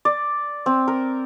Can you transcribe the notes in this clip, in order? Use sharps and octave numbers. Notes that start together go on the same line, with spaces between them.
D5
C4
A#4